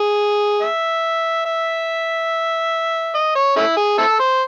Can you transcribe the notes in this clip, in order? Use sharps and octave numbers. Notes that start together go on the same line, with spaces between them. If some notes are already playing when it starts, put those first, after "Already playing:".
Already playing: G#4
E5
E5
D#5
C#5
A3 C#4 E4
G#4
C4 E4 A4
C5